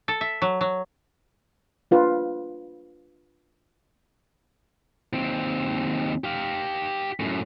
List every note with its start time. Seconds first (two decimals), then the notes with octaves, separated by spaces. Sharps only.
0.08 A4
0.21 E5
0.42 F#3
0.61 F#3
1.91 D4 F4 B4
5.13 D#2 C4
6.24 G4 F5
7.20 F#2 A2